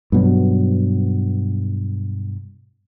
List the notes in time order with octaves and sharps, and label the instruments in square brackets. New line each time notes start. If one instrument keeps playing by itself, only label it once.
[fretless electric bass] G2 B2 F#3